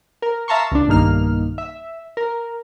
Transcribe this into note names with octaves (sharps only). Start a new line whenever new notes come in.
A#4
E5 F5 A5 A#5 C6 C#6
C#2 D4
B1 G2 D#3 A#3 D#4 F6
E5
A#4